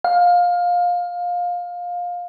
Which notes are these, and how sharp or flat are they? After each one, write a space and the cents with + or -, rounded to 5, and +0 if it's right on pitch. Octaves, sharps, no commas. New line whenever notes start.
F5 +20